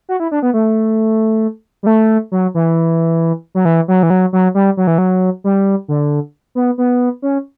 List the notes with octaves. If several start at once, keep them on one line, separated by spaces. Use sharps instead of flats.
F#4
E4
D4
B3
A3
G3
A3
F#3
E3
F#3
E3
F#3
E3
F#3
F#3
G3
F#3
E3
F#3
G3
D3
B3
B3
C#4